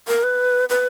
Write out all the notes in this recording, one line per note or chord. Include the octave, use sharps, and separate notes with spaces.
A#4
B4
B4